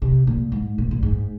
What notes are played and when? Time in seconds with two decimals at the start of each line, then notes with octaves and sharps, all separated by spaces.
0.02 C3
0.27 A#2
0.52 G#2
0.78 A#2
0.91 A#2
1.03 G#2